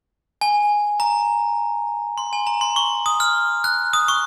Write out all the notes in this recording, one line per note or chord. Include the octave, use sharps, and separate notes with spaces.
G#5
A#5
C6
G#5
A#5
C6
C#6
D#6
F6
F#6
D#6
C#6